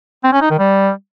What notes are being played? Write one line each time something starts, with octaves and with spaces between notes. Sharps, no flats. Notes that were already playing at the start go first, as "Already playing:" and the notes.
C4
C#4
D#4
D#3
G3